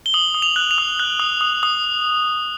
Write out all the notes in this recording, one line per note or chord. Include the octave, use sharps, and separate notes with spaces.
G7
D#6 F#7
D#6
F7
F#6
F7
D#6
F#6
D#6
D#6
D#6